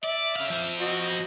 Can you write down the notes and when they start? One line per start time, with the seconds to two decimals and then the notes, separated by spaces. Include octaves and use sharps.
0.04 D5 E5
0.36 C#4 F5
0.50 F3 C4
0.81 F#4 D#5